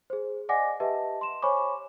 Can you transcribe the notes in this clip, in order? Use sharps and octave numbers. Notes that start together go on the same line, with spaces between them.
G#4 C5
D5 D#5 F#5 G#5 D6 A#6
G4 B4 D#5 E5 A5
C6 E7
C5 C#5 G#5 B5 C#6 D6